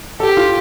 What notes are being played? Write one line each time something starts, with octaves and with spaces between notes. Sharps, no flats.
G4 A4
F4